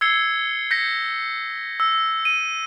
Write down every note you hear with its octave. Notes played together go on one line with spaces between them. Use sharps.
E6 G#6 C7 C#7 G7
G6 G#6 A#6 B6 C#7
E6
D#7